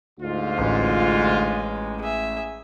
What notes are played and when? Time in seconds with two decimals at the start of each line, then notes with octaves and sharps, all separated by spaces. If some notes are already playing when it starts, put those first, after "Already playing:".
0.20 D2 G#2 F4
0.58 A1 G#3
2.01 G#4 E5